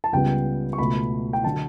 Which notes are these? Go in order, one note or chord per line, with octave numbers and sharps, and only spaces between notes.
A5
C#2 C#3 G3 B3 G5
C#6
C#2 B2 A3 B5
G5
D3 F#3 A5